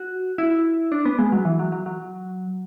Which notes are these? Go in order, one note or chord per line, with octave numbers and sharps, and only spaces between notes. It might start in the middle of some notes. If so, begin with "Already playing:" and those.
Already playing: F#4
E4
D4
B3
G#3
F#3
E3
F#3
F#3
F#3